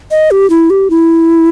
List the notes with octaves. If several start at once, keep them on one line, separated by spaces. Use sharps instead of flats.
D#5
G4
E4
G4
E4